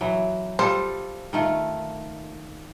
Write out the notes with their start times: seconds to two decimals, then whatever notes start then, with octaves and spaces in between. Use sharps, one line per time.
0.01 E3 F#3
0.59 G3 F4 A4 C5
1.33 D#3 A3 F4